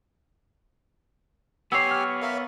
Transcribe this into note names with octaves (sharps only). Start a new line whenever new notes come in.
B3 G4 C#5 G#5 E6 C7
F6
A#4 E5 F5